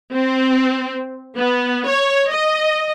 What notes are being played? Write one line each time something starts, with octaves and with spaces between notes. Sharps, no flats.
C4
B3
C#5
D#5